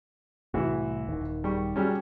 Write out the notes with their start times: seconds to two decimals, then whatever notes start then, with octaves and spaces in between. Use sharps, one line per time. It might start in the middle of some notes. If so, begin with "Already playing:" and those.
0.54 C2 A2 E3 F#4
1.09 D#1 D#3
1.44 G3 C#6
1.76 F#3 G3 C#4